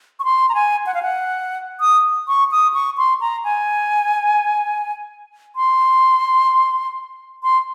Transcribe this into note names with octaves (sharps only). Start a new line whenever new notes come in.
C#6
C6
A#5
G#5
F#5
F5
F#5
D#6
C#6
D#6
C#6
C6
A#5
G#5
C6
C6